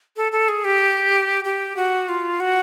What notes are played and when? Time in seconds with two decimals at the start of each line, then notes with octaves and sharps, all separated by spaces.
0.16 A4
0.32 A4
0.48 G#4
0.65 G4
1.45 G4
1.76 F#4
2.09 F4
2.40 F#4